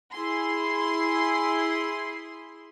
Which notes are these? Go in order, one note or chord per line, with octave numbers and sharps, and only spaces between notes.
E4 G#4 C6